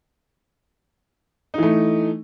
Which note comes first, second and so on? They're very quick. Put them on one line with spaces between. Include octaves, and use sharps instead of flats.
D#4 E3 A3